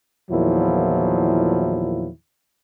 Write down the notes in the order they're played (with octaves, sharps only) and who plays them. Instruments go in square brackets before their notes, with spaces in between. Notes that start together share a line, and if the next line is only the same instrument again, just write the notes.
[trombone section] E2 A#2 D#3 F3 F#3 E4